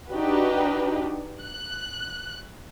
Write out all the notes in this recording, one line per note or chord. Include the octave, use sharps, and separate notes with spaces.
D4 D#4 F#4 G4 B4
F#6